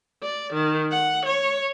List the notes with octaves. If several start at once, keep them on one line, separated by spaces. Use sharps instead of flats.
D5
D#3
F#5
C#5